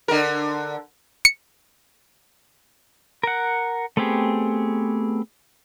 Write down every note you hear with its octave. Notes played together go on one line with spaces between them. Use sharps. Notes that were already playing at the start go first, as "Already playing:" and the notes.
D3 A#4
C#7
A#4 F#5
A3 B3 C4 G4 G#4